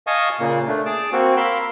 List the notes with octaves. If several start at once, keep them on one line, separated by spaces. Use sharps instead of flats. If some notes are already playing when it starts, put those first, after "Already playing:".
D#5 F5 G#5 A5 C#6 D#6
A#2 C#3 A#3
A3 D4
G#4 A5 D6
A#3 C4 F#4
A#4 F5 B5 C6 E6